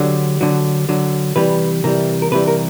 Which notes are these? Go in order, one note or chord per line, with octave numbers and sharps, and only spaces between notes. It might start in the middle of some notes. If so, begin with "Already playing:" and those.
Already playing: D3 F#3 G4
D3 F#3
D3 F#3
C3 E3 G3 B4
C3 E3 G3 A#4
A#4
C3 E3 G3 B4
A#4